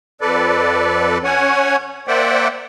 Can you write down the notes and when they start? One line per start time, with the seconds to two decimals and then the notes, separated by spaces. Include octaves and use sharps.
0.21 F2 A4 B4 D5
1.24 C#4 C#5 F#5 G#5
2.08 A#3 C5 D5 E5 F#5 G5